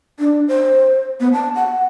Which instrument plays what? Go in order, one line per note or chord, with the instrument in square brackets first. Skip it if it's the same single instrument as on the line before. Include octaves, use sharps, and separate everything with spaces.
[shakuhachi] D4
C5
B3
A5
F#5